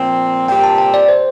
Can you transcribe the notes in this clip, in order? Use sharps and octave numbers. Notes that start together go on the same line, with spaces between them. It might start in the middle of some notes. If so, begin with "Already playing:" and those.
Already playing: A#2 F3 C4 G5
A#2 G3 C4 G4 G5
A5
G5
D5
C5